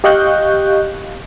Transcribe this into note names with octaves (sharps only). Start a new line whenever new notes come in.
G4 D#5 F5 C#6 F#6 G6